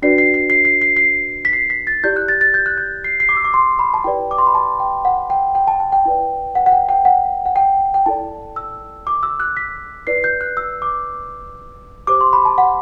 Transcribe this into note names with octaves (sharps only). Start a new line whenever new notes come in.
D4 F#4 B4 D5 C7
C7
C7
C7
C7
C7
C7
B6
C7
B6
A6
E4 G4 D5 G6
F#6
A6
A6
G6
F#6
G6
C7
C7
D6
E6
D6
C6
B5
A5
E4 G4 B4 D5 G5
D6
C6
B5
A5
G5
F#5
G5
G5
A5
A5
G5
E4 B4 D5
F#5
F#5
G5
G5
F#5
F#5
G5
G5
E4 A4 D5 A5
E6
D6
E6
F#6
B6
E4 B4 D5 C7
G6
F#6
E6
D6
G4 C5 D6
C6
B5
A5
F#5